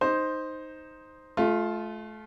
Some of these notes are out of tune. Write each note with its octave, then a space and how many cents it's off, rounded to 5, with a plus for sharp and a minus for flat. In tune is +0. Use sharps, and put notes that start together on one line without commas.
D#4 +0 C5 +0
A3 -30 F4 +0